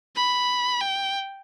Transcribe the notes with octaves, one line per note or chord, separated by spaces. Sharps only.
B5
G5